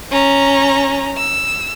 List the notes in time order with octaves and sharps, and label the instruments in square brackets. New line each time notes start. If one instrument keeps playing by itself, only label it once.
[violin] C#4 A#5
E6